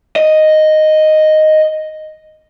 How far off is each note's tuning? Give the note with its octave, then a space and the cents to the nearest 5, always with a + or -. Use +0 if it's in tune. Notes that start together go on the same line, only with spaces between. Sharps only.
D#5 -5